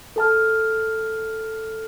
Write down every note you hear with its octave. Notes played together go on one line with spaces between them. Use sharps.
A4 A5 F6